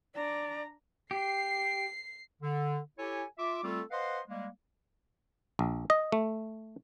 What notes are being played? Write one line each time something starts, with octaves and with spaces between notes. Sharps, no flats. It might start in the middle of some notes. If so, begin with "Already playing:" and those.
D4 D5 A#5
G4 C7
D3
E4 G4 A4 C#5 G#5
F4 E5 D6
G3 A3 C4 F4 A4
B4 C5 D#5 F5 F#5 C6
G3 G#3 A#3
A#1
D#5
A3